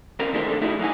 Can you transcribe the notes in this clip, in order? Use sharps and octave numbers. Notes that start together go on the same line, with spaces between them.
C#3 C4 A#4
D#3 A3 D4 G#4 C5
C3 D4 A4
C#3 A3 D#4 E4 F#4 G#4
F#3 D#4 F5 G#5